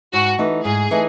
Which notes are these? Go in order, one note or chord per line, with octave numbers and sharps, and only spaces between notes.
G#2 F#4
E3 A3 D#4
G#2 G#4
E3 A3 D#4